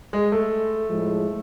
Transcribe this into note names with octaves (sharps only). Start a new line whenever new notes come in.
G#3
A3
A2 F3 G#3